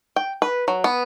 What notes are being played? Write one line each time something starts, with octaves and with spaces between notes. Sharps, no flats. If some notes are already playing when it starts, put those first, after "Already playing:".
G5
B4
F#3
B3